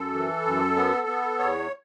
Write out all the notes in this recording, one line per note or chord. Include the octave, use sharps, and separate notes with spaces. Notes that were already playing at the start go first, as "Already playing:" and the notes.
Already playing: F#2 A4
E3
F#2
B3
B3
E2 C#5